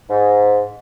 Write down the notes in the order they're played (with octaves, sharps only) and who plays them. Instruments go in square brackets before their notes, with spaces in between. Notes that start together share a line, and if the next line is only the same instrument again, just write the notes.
[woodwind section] G#2